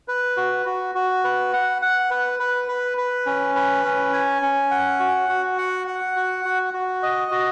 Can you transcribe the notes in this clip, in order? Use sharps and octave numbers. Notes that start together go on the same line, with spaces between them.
B4
F#4
F#4
F#4
B4
F#5
F#5
B4
B4
B4
B4
C#4
B4
C#4
G#5
C#4
F#5
F#4
F#4
F#5
F#5
F#4
F#4
F#4
D#5
F#4